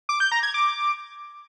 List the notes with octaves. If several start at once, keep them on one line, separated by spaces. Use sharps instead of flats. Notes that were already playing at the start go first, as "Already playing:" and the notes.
D6
G6
A#5
G#6
D6